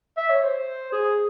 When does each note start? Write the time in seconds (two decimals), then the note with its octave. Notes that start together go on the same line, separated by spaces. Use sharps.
0.17 E5
0.30 C#5
0.44 C5
0.92 G#4